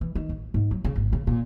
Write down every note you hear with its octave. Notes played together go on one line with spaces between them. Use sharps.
E3
D#3
A1
G#2
F#3
C#3
G#1
C#3
A#2